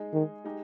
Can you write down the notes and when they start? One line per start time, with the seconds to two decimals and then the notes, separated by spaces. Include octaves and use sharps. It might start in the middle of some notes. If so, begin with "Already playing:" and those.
Already playing: G#3 D#4 G#4 D#5
0.13 D#3
0.44 G#3 D#4 G4